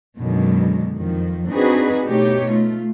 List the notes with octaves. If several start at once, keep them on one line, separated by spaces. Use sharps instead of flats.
F#2 B2 D3 D#3 F#3 G#3
F2 D#3 F3
C4 D4 D#4 F#4 G#4 B4
B2 A3 D#4 G4 C#5
A3 F4